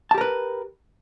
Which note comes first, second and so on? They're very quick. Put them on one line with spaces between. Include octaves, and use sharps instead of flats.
A5 G4 A#4 B4